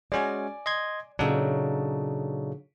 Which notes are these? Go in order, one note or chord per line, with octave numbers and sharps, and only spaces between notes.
G#3 C#4 F#4 D5 G#5
D#5 C6 G#6
A#2 C#3 F#3 D4 D#4 A4